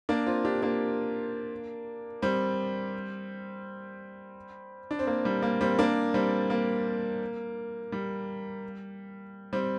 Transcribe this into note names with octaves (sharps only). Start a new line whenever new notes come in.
A#3 D4
C4 F4
D4 G4
A#3 D4
G3 C4
D4
C4
A#3
G3
A#3
G3 C4
A#3 D4
G3 C4
A#3
G3
G3 C4